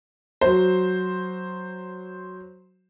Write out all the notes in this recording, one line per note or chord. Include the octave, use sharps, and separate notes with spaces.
F#3 C5